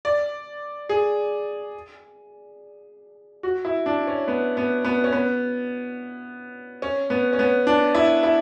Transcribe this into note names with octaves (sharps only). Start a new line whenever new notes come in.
D5
G#4
F#4
E4
D4
C#4
B3
B3
B3
C#4
B3
C#4
B3
C#4
B3
D4
E4
E4